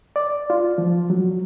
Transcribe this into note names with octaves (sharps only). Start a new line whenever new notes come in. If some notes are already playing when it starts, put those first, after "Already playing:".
D5
F4
F3
F#3